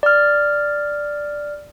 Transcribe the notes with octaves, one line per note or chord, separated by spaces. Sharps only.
D5 F6